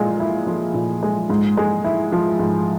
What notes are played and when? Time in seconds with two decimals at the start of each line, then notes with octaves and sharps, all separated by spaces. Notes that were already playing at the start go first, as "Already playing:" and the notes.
Already playing: A#2 G#3
0.20 E4
0.47 F3
0.74 A#2
1.03 G#3
1.30 G#2
1.57 G#3
1.84 E4
2.12 F3
2.39 G#2